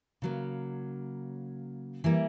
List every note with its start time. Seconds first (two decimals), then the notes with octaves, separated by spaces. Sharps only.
0.22 C#3 F#3 A#3
2.04 E3 G3 A#3